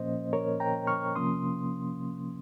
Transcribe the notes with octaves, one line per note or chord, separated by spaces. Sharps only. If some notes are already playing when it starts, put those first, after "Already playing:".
Already playing: A#2 F3 A#3 C#4 C5 D#5
A#4 C#5
G5 A#5
C#6 F6
C3 F3 A#3 C#4 C6 D#6